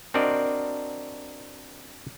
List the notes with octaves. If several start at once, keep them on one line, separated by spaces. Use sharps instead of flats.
C4 D4 F#4 A#4 D5 D#5